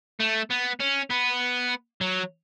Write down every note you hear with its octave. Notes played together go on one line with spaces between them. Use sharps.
A3
B3
C#4
B3
F#3